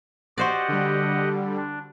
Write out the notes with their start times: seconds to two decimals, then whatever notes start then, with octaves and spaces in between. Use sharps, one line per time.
0.38 F#4 G4 C5 D5 D#5 F#5
0.68 D3 G3
1.57 D4